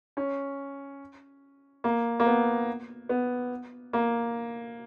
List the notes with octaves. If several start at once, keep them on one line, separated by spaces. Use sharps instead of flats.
C#4
A#3
A#3
B3
B3
A#3